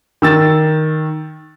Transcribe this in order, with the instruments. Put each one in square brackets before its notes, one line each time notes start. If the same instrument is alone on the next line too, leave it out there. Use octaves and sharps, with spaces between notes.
[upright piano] D#3 E6 A6